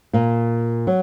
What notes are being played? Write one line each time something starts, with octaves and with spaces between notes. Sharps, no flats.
A#2
F#3